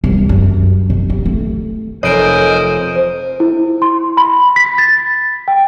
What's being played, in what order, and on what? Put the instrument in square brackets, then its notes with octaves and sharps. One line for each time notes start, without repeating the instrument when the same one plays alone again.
[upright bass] C2
F#2
C3
B3
A3
[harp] F1 [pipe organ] A#4 C5 G#5 [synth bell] C#5 D7 [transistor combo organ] D#5
[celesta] C5
E4
C6
B5
B6
A6
G5